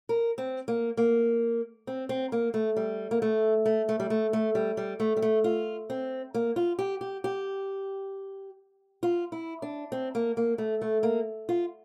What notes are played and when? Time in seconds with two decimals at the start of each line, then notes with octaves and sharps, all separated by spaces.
0.09 A#4
0.38 C4
0.68 A#3
0.97 A#3
1.87 C4
2.09 C4
2.32 A#3
2.54 A3
2.76 G3
3.11 A#3
3.22 A3
3.66 A3
3.89 A3
4.00 G3
4.10 A3
4.33 A3
4.55 G3
4.77 G3
5.00 A3
5.17 G3
5.22 A3
5.44 F4
5.90 C4
6.34 A#3
6.56 F4
6.79 G4
7.01 G4
7.24 G4
9.03 F4
9.32 E4
9.62 D4
9.92 C4
10.15 A#3
10.37 A#3
10.58 A3
10.82 A3
11.03 A#3
11.49 F4